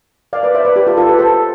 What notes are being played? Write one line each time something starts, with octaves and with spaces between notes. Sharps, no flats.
D5 F5
B4 D5
C5 E5
B4 D5
G4 B4
F4 A4
F4 A4
G4 B4
A4 C5